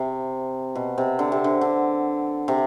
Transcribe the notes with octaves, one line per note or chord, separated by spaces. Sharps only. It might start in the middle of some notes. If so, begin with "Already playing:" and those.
Already playing: C3
B2
C3
D3
C3
D3
D3
C3